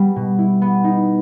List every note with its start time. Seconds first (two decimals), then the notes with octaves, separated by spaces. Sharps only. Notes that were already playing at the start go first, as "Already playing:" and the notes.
Already playing: G3 B3
0.16 B2
0.38 E4
0.62 B3
0.84 D#4